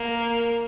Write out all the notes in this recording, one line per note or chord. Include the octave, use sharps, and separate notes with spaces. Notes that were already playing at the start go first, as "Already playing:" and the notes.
Already playing: A#3